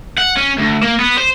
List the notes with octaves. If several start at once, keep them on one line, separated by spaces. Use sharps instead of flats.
F#5
C#4
D2
A#3
B3
C5